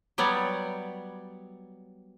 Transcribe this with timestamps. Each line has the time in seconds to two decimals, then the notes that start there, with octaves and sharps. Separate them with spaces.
0.18 F#3 G3 B3 C#5 D5